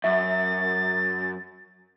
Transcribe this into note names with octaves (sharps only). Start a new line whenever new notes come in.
F#2 E5 A6